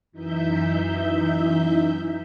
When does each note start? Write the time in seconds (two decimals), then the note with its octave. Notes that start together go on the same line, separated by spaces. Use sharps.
0.12 F#2 E3 D#4 E5 G6